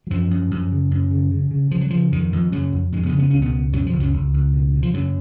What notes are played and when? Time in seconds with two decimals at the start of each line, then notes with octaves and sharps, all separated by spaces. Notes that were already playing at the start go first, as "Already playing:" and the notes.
0.07 F#3
0.10 F#2 F3
0.31 F#2
0.51 F#2
0.71 C#3
0.91 F#2
1.11 C#3
1.31 C#3
1.51 C#3
1.71 C#3 F3
1.81 F#3
1.90 C#3 F3
2.12 F2 D#3
2.32 F2
2.52 F#2 C#3 F#3
2.72 F2
2.92 F2 G#2 G#3
3.06 B2 B3
3.13 C#3
3.19 B3
3.30 C#2 C#4
3.42 B2 B3
3.53 B2
3.73 F#2 B2 F#3
3.86 F3
3.93 C#2
4.00 F#2 F#3
4.13 C#2
4.34 C#2
4.53 B2
4.73 B2
4.83 F3
4.94 F#2 C#3 F#3